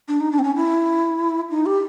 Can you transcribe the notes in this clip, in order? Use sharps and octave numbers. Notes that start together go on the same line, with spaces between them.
D4
D#4
D4
C4
C#4
E4
D#4
G4